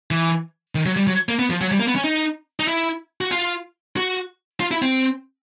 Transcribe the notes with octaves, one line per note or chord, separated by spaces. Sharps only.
E3
D#3
F#3
G3
F#3
A#3
B3
F3
F#3
G3
A#3
B3
C#4
D#4
D#4
E4
F#4
F4
F#4
F4
E4
C4